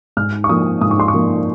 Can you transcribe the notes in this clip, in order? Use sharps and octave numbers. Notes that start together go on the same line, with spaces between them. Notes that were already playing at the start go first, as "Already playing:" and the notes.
G#2 F6
C#6
F3 A#3 D#6
G#2 D#6
C#6
C6
C#6
F3 A#3